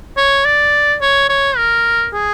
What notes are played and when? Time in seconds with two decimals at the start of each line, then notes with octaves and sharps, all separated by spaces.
0.17 C#5
0.45 D5
1.01 C#5
1.29 C#5
1.57 A#4
2.13 G#4